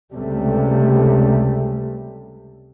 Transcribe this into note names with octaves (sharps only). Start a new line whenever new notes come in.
C#2 C3 G3 A3